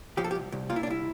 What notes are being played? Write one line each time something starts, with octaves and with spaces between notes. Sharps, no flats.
F3 G4
A4
G4
C2
C2
A#2 F4
E4
D4
C2 E4